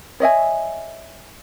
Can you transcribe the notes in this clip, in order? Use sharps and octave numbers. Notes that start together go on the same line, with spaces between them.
C#5 D#5 E5 G#5